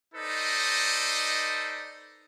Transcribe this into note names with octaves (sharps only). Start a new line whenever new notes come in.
D#4 A4 B4 C5 D5 D#5